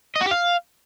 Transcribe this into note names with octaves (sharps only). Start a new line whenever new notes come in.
D#5
F#4
G4
F5